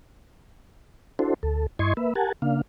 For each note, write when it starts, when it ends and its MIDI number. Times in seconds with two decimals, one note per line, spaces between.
1.19 1.34 62
1.19 1.34 64
1.19 1.34 66
1.19 1.34 69
1.19 1.34 72
1.43 1.67 38
1.43 1.67 69
1.79 1.94 43
1.79 1.94 64
1.79 1.94 75
1.79 1.94 84
1.79 1.94 85
1.79 1.94 92
1.97 2.14 58
1.97 2.14 71
1.97 2.14 76
2.15 2.32 67
2.15 2.32 70
2.15 2.32 78
2.15 2.32 80
2.15 2.32 81
2.42 2.62 49
2.42 2.62 58
2.42 2.62 62
2.42 2.62 77